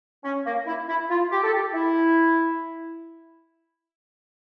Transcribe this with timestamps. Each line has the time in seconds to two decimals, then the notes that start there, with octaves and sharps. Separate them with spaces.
0.24 C#4
0.45 A#3
0.67 E4
0.89 E4
1.10 F4
1.32 G4
1.43 A4
1.53 G4
1.74 E4